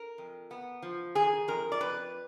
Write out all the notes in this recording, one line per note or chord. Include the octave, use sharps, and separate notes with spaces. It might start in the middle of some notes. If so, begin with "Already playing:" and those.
Already playing: A#4
F2
B3
F3
D#3 G#4
F2 A#4
D5
F2 B4